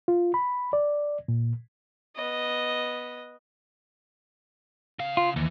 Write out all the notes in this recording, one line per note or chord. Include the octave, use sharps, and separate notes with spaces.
F4
B5
D5
A#2
B3 D#5
C#3 F5
F4
D#2 E3